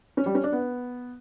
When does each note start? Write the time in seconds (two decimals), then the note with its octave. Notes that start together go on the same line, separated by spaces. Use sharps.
0.17 C#4
0.26 G3
0.35 C#4
0.43 D4
0.52 B3